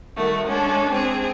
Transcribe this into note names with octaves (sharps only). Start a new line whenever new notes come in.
D#3 G3 A3 F#4
G#3 C#4 D4 A4
C4 G#4